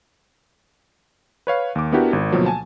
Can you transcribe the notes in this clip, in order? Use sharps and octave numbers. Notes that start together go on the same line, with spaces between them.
B4 C#5 F5
D#2 D6
B3 D4 E4 F#4 G4 A#4
G#1
D2 B2 F3 F#3 A#3
G#5 A5